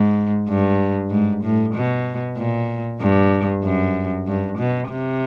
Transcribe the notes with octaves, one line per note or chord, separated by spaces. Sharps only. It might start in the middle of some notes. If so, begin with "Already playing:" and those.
Already playing: G#2
G2
G#2
A2
B2
A#2
G2
F#2
G2
B2
C3